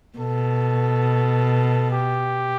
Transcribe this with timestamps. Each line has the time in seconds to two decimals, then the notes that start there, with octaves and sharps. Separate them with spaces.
0.18 B2 A4
1.91 G4